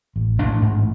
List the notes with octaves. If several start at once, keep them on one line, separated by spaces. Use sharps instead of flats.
A1
A1 D4
G#2